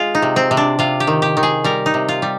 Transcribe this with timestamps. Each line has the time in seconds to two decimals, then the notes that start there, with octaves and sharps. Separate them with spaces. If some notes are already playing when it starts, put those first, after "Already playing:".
Already playing: G#3 F4 G#4
0.15 D#4
0.22 C3
0.36 C4
0.51 C3
0.57 D4
0.79 C3 F4
1.00 G4
1.07 D#3
1.22 G4
1.37 D#3
1.43 G#4
1.64 G3 A#4
1.86 D#4
1.94 C3
2.08 F4
2.22 G3